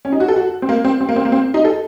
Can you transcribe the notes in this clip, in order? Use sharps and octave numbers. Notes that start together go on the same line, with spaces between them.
C#4
D#4
F#4
A4
F#4
C4
A#3
C4
C4
A#3
C4
A#3
C4
D#4
A4